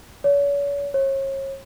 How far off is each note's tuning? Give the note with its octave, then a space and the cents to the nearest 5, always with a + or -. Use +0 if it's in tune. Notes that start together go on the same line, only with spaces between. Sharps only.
C#5 +40
C#5 -35